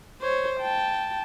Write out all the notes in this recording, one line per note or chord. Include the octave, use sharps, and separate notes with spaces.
C5 C#5
G5 A5